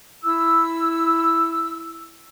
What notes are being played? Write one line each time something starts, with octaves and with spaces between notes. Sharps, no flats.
E4 E6